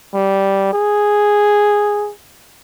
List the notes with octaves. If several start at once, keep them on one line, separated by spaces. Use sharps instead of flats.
G3
G#4